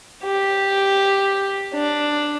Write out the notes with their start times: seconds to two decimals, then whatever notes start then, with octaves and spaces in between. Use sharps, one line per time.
0.23 G4
1.74 D4